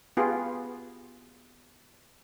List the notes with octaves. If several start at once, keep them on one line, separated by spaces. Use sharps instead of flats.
B3 F4 G4 G#4